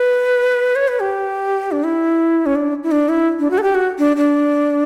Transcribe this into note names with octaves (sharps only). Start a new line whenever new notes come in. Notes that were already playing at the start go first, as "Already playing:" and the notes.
Already playing: B4
C#5
B4
G4
D4
E4
C#4
D4
E4
D4
E4
D4
F#4
A4
G4
F#4
D4
D4